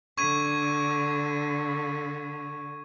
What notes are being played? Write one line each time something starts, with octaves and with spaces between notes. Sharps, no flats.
D3 C#6 G#6 D#7